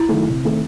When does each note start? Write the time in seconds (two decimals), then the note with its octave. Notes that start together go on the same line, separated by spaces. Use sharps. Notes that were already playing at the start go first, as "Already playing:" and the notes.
Already playing: E4
0.09 D#3 F#3 A3
0.27 C3
0.44 D#3 A3 C4